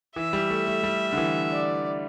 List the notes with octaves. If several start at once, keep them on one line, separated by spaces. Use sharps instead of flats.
E3 E5
G3
A3
A3
G3
D3
E3
D5